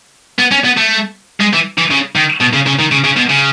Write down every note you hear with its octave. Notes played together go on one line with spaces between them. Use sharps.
B3
C#4
B3
A3
G#3
E3
E3
C#3
D#3
B2
C#3
C#3
D#3
C#3
C#3
B2
C#3